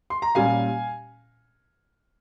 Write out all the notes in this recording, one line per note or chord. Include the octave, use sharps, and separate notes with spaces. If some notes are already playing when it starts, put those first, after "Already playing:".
C6
A#5
A#2 G3 C#4 F5 G#5